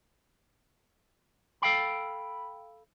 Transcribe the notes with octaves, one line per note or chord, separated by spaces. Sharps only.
A4 F5 G5 B5